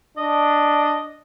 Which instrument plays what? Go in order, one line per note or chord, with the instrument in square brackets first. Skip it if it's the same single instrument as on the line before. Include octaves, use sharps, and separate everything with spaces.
[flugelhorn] D4 [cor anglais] D#5